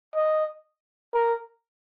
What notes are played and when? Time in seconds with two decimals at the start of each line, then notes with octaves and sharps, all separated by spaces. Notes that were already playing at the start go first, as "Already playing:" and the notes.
0.15 D#5
1.14 A#4